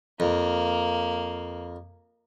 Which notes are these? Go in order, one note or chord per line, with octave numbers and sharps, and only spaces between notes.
F2 A#3